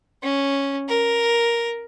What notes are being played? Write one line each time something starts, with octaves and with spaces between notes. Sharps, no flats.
C#4
A#4